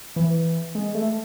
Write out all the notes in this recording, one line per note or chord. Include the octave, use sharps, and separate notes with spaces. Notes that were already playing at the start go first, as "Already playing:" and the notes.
E3
G#3
A3